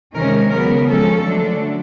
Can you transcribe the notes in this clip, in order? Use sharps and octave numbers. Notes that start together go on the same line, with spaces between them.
C3 D#3 G#3 C#4 A#4
C#3 F#3 B3 A#4
F3 G#3 C#4 A4
D3 F#3 A3 D4